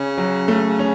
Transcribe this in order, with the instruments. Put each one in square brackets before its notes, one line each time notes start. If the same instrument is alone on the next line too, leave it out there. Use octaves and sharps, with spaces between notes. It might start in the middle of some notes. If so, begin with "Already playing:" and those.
Already playing: [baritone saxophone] C#3 [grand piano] C#4
[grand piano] F#3
A3
C#4